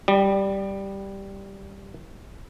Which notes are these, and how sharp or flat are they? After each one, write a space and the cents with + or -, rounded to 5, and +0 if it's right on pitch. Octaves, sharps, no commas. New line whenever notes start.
G3 +0 D5 +45